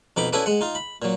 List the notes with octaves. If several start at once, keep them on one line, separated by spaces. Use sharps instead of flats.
F2 B2 D#4 B5 D6
C#4 E4 F#4 A4 B4 D5
G#3 F#5
D#4 F4
B5
A#2 F#3